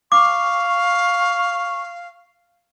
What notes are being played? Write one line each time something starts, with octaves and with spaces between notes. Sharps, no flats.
F5 C#6 D6